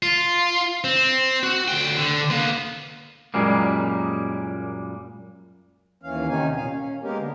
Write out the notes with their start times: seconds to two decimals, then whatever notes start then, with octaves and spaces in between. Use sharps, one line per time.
0.02 F4
0.84 C4
1.43 F#4
1.68 D2 G5
1.98 D3
2.30 A#3 B3
3.34 F#2 A#2 G3 G#3 A#3
6.02 D#2 E3 C#4 F5
6.29 C3 D#3 C#4 D#4 G#5
6.56 A#2 F5 G#5
6.72 C#4
7.03 G#3 A#3 B3 G4 A#4
7.18 D3